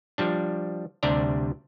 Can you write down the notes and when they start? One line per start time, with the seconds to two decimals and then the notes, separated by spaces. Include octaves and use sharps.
0.18 F3 G3 D4
1.03 D2 C3 G3 D4 D5 A#5